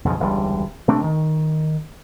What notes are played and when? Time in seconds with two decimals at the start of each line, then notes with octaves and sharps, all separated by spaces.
0.05 B1 F2 C#3 F3
0.19 E1 C#2 D3 G3
0.88 C3 A3 C4 D4
1.04 D#3